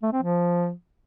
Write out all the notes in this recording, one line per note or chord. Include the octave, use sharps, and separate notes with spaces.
A3
C4
F3